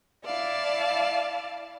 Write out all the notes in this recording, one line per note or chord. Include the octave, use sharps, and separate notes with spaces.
E4 D5 F5 A5